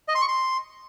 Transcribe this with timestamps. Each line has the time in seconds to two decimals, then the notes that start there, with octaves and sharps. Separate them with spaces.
0.08 D#5
0.15 C6
0.22 C#6
0.28 C6